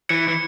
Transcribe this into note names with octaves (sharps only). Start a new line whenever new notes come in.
E3 C#7
E3